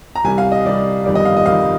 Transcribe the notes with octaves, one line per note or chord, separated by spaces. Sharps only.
A#5
C2 C3 G3 G#5
F5
D#5
C2 C3 G3 D5
G1 F2 D#3 G3 D5
D#5
F5
D#5
G1 F2 D#3 G3 F5